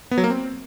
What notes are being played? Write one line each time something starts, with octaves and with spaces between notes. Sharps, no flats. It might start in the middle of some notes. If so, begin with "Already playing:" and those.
B3
F#3
A#3
C4